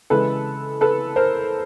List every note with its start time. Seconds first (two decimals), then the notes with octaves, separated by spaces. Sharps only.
0.10 C#3 E3 G#3 A4 B4
0.81 A4 B4
1.16 A#4 C5